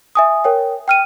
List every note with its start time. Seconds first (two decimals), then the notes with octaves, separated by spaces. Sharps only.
0.15 E5 G#5 D#6
0.44 A#4 C#5 G5
0.88 G5 F6 D#7